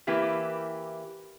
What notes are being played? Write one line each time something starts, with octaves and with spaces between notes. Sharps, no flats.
E3 A#3 E4 G4 B4